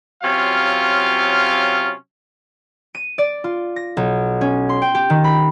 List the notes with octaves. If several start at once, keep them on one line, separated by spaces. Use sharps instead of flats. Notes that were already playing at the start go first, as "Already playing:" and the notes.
C3 F#3 C#4 F4 F5
D#7
D5
F4
A#6
B1
C#4
C6
G5
G4
D#3
B5